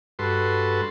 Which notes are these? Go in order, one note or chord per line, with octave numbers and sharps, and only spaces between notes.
G2 F#4 A4 B4 C6